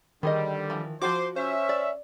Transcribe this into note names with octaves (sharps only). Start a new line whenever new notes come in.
D3 D#3 G3 D#4 G#4 D#5
E3 F3
F3 F#3 F#4 C5 D6
C#4 C5 E5
D5